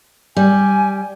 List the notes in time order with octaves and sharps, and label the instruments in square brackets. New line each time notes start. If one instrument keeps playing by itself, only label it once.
[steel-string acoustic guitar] G3 [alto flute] G#5